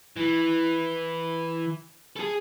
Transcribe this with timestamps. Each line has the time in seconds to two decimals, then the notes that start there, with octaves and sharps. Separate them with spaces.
0.16 E3
2.16 G#4 A4